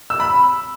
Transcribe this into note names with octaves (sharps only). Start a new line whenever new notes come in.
E6
B5